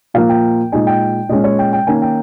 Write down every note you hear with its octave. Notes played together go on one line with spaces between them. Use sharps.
A#2 F3 A#3 F5
G5
A#2 G#3 D#4 G#5
G5
A#2 G#3 C#4 D#5
C#5
G5
G5
D#3 A#3 C#4 G#5
G5